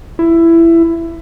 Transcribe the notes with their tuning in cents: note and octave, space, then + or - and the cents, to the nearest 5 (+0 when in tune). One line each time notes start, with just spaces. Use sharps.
E4 +15